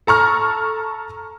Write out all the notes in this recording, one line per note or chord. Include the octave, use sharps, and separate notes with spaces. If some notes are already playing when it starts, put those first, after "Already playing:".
A4 A#5 C#6 F6